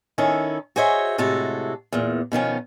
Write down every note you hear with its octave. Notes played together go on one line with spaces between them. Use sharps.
D#3 C#4 E4 A4
F#4 G#4 C5 C#5 D#5 E5
A2 C3 G#3 F#4 A4
E2 A#2
B2 D#3 F3 C#4